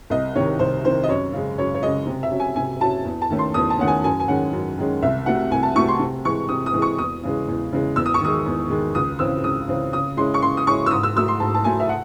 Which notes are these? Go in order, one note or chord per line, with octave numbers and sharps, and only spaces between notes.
C2 D#5
C3 D#3 C#5
C2 C5
C3 D#3 C5
D#5
F#2 C#5
C#3 G#3
F#2 C#5
C#5
C#3 G#3 D#5
C3
E5
F#3 C#4
G#5
C3 G#5
F#3 C#4 A5
E2
A5
D#3 A3 C#4
C6
E2 D#6
A5
D#3 A3 C#4 F#5
G#5
F#2 G#5
G#5
D#3 G#3 C#4 F#5
F#2
D#3 G#3 C#4
C2 E5
C3 F#3 A3 F#5
C2 G#5
A5
C3 F#3 A3 C#6
C6
C3
E3 G#3 C#6
C3 D#6
D#6
E3 G#3
C#6
E2 D#6
C#3 E3 G#3
E2
C#3 E3 G#3
E2 E6
D#6
C#6
D#3 G#3 D#6
E2
D#3 G#3
C#2 D#6
C#3 E3 C4 E6
C#2 D#6
C#3 E3 C4
C#3 D#6
G#3 C#4 E4 C6
C#6
C#3 C6
D#6
G#3 C#4 E4 C#6
E6
G#2 D#6
E6
F#3 A3 E6
C6
G#2 A5
A5
F#3 A3 G#5
E5
F#5